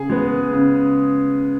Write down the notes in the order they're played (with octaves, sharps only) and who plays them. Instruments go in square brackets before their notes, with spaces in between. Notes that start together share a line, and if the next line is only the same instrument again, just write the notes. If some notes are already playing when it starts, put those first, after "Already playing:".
Already playing: [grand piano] C#3 G#4
G#3 B3
C#3